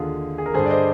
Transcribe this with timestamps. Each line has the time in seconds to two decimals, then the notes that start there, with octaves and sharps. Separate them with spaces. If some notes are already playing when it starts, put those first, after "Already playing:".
Already playing: D#2 D3 F4 G#4
0.38 G#4
0.46 A#4
0.54 G2 D3 G#4 C5
0.66 D5
0.70 C5 D#5